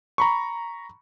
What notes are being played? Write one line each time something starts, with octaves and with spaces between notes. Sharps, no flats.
A#5 B5 C#6